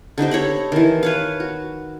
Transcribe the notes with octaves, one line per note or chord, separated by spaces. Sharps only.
D3 D#4 G4 C5
A4 C#5 A#5 B5
D#3 E3
B4 C#5 F5
F#4